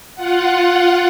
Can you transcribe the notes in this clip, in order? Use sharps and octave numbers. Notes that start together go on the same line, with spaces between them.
F4 F#5